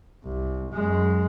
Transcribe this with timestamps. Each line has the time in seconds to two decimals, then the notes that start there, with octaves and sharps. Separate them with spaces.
0.24 C2
0.73 F#2 G#3